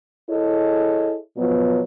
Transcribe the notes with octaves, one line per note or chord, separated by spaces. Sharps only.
E4 G#4 A4 C#5 D#5
B2 F3 F#3 B3